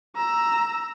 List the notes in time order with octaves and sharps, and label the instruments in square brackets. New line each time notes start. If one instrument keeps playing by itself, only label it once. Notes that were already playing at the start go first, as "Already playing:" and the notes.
[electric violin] A#5 E6